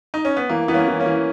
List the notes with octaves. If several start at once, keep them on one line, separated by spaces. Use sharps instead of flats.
D#4
C#4
B3
E3 A#3
E3 B3
A#3 C#4
E3
A#3 C#4
E3